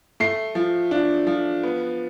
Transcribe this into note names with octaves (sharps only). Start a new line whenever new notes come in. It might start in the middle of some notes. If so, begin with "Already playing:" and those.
A3 C7
F3
D4
F3
B3